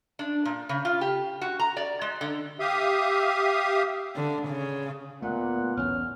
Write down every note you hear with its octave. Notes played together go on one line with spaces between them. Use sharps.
D4
A#2
C#3
F4
G4
F#4
A#5
D5
G#3
D3
G4 E5 F5 D#6
D3
C#3
D2 A#2 A3 B3 F#5
B1 E2 A2 C#4 F6